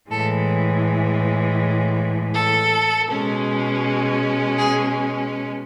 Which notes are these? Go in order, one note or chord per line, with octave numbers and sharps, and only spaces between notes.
A2 E3 G#3 A4
A4
B2 G#3 C#4
G#4